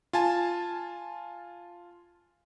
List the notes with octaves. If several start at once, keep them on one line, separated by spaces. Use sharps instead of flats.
F4 G#5 A5